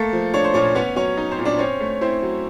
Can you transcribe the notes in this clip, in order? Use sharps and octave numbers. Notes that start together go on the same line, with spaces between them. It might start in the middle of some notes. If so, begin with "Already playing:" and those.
Already playing: A3 A#3 A4
F3
D4 C#5
C5
A#2 C#4 C#5
B3 C#4 C#5
F#3 C#4 C#5
D#4
C4 C5
A#2
D4 D5
C4 C#4 C#5
A3
C4 E4 C5
F#3